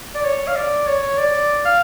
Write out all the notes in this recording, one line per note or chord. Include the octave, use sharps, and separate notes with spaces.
D5
C#5
F5
D5
C#5
D5
F5